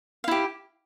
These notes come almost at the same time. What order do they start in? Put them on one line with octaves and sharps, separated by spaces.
F5 E4 G4